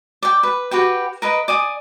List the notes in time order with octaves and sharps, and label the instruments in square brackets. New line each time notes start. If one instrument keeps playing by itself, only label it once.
[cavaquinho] D5 G5
B4
F#4 G4 B4 G5
A#4 B4 D#5
D5 G#5 D#6